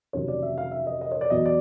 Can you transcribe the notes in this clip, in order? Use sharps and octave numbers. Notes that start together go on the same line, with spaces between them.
F1 D#2 C#3 F#3 C#5
D5
E5
F5
E5
D#5
D#5
C#5
D5
E2 B2 F#3 D#5
D5